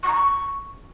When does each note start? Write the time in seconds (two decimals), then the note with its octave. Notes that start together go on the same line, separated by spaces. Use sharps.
0.03 C#6
0.08 A#5
0.13 C#6